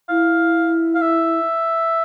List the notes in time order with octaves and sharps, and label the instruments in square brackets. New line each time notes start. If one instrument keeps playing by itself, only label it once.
[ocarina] E4 [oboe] F5
[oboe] F5
E5